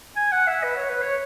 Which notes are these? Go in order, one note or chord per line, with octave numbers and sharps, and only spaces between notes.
G#5
F#5
E5
B4
C#5
B4
C#5